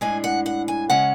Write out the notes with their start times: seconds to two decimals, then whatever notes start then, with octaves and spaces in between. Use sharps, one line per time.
0.01 A2 G#3 D4 G#5
0.24 F#5
0.46 F#5
0.68 G#5
0.90 C#3 G#3 C#4 F#5